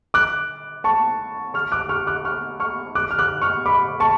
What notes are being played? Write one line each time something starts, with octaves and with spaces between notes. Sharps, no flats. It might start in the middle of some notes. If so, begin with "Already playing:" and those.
D6 F#6
A5 C#6
C#6 F6
D6 F#6
C#6 F6
D6 F#6
C#6 F6
C#6 F6
D6 F#6
F6
D6 F#6
C#6 F6
B5 D6
A5 C#6